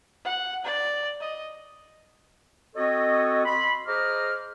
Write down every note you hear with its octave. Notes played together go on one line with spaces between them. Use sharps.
F#5
D5
D#5
C4 F#4 A4 C#5 D#5
B5 C6
G#4 C5 D#5 A#5 D6 F6